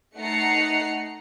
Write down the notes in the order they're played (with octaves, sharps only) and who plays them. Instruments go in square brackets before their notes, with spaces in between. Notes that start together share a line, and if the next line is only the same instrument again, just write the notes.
[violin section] A3 D#4 F#5 A#5 C7 C#7